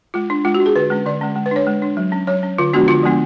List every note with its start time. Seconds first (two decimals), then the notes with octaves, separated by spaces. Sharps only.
0.14 G#3 F4
0.30 D4
0.45 G#3 F4
0.55 F#4
0.60 D4
0.66 G#4
0.76 D3 B4
0.90 G#3 C#4
1.06 D3 D5
1.21 G#3 C#4
1.36 G#3
1.46 B4
1.51 D4 C#5
1.67 G#3
1.82 D4
1.97 F#3
2.12 C#4
2.27 F#3 C#5
2.43 C#4
2.58 D3 F4
2.73 F3 G#3 B3 D4 F#4
2.88 D3 F4
3.03 F3 G#3 B3 D4